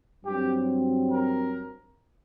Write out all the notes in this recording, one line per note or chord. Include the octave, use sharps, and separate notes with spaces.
G2 F#3 C4 G4
A#4